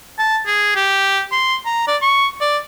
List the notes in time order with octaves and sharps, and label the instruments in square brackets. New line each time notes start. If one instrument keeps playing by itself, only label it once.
[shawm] A5
G#4
G4
C6
A#5
D5
C#6
D5